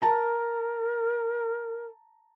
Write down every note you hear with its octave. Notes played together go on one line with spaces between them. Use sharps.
A#4 A5 A#5